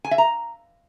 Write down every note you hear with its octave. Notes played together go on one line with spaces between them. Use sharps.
G#5
E5
A#5